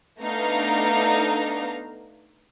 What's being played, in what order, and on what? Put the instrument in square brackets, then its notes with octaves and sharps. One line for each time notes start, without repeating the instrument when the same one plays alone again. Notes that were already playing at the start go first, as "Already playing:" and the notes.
[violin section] A3 B3 D4 D#4 F5 A#5